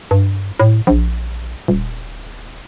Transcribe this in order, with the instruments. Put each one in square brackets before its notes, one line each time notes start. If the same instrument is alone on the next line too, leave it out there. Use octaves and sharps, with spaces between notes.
[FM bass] G2
A2
A#1
D#1